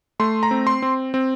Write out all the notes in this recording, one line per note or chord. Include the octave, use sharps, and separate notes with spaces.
A3 C6
A#5
C4
C6
C4
C4